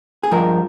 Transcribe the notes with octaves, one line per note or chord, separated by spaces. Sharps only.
G#4
G2 F3 G#3 A#4